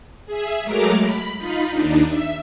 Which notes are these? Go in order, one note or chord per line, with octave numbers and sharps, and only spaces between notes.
G#4 E5
F#3 G#3 A3 A#4 A#5 D6
B5
D#4 F4 B5
D#2 D4 D#4
E5